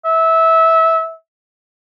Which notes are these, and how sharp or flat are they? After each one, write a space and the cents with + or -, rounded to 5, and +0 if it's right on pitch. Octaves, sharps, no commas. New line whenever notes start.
E5 -20